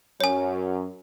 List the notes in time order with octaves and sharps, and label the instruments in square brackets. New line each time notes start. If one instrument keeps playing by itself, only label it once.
[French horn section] F#2 [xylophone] C#5 G#5